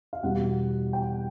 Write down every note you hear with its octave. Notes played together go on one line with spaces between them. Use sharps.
F5
E2 B2 G3 F#5
G5